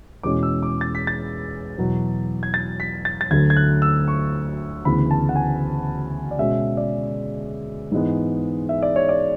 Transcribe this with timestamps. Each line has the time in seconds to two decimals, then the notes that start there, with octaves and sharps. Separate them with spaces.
0.23 E2 B2 G#3 C#4 D6
0.43 E6
0.63 D6
0.81 A6
0.95 B6
1.07 A6
1.77 E2 B2 F#3
2.43 G#6
2.54 A6
2.80 B6
3.05 A6
3.21 A6
3.31 D2 D3 F#3 A3 G#6
3.50 G#6
3.57 F#6
3.82 E6
4.08 C#6
4.85 D2 C#3 E3 B3 B5
5.11 A5
5.29 F#5
5.36 G#5
6.31 D5
6.39 B2 G#3 C#4 E5
6.77 D5
7.92 G#2 E3 G#3 B3
8.69 E5
8.82 D5
8.96 C#5
9.09 D5